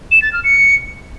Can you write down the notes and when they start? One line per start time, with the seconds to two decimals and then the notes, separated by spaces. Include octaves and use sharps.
0.11 E7
0.22 A6
0.33 F6
0.44 C#7